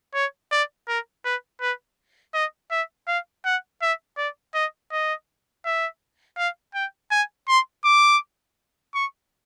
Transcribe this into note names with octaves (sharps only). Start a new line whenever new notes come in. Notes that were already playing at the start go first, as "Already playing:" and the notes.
C#5
D5
A#4
B4
B4
D#5
E5
F5
F#5
E5
D5
D#5
D#5
E5
F5
G5
G#5
C6
D6
C#6